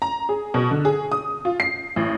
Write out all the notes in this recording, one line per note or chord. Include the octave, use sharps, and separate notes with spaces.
A#5
G#4
B2
D3
G#4
D#6
F4
C7
A1